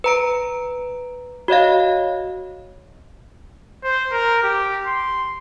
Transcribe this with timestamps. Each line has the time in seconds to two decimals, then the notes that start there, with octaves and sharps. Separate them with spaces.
0.04 B4 A#5 D7
1.48 F#4 C#5 D#5 F5
3.83 C5
4.12 A#4
4.43 G4
4.86 C6